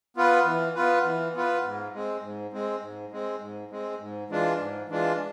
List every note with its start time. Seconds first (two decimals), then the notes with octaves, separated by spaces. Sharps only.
0.17 B3 F4 B4
0.45 E3
0.75 B3 F4 B4
1.05 E3
1.35 B3 F4 B4
1.64 G#2
1.93 G#3 C4
2.23 G#2
2.53 G#3 C4
2.82 G#2
3.12 G#3 C4
3.41 G#2
3.71 G#3 C4
4.00 G#2
4.30 E3 G#3 D4 F4
4.59 G#2
4.89 E3 G#3 D4 F4